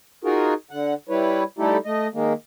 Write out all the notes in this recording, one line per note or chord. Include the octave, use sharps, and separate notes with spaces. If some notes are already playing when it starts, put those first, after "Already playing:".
D#4 F4 F#4 G#4 A#4
D3 F#5
G3 E4 B4 C#5
G3 A3 D#4 E4 G4 A4
A3 D#5
D#3 G#3 A#3